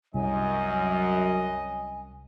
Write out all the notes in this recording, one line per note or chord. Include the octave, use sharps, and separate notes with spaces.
C2 F#2 D#5 G#5